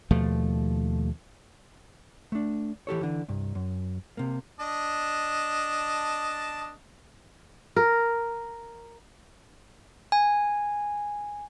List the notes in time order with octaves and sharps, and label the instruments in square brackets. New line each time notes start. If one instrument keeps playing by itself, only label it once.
[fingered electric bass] D#2 B2 F3 A3
[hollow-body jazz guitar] A3 D4
E3 G4 A4 C#5
D3 E3
C2 G2
F#2
C3 A#3
[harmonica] D4 D#5 A5
[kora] A#4
[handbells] G#5